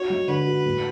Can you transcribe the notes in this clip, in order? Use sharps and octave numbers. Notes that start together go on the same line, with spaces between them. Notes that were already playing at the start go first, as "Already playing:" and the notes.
Already playing: F#4 C#5
G#3
D3 B4
F#4
A2